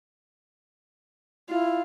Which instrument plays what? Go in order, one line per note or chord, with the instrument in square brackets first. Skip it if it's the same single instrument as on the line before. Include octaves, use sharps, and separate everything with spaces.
[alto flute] E4 [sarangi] F4